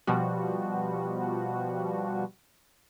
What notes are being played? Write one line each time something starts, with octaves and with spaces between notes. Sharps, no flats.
B2 F3 G3 F#4